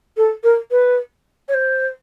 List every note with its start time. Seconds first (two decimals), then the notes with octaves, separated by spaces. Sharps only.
0.17 A4
0.43 A#4
0.71 B4
1.48 C#5
1.54 C5